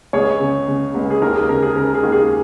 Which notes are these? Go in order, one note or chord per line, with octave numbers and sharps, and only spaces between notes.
C#2 G#4 C#5
C#3
C#3
C#2
G#4
D#2 A#4
G#4
C#3 A#4
G#4
C#3 A#4
G#4
D#2
G#4